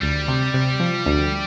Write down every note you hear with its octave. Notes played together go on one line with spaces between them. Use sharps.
D2 G3
C3
C3
F3
D2